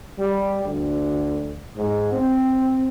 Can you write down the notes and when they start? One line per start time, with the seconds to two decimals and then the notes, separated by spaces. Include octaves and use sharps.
0.19 G3
0.63 D2
1.75 G#2
2.12 C4